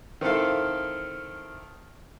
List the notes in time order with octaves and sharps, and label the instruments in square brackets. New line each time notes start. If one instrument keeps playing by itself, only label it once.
[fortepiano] D#3 C4 E4 A4 F5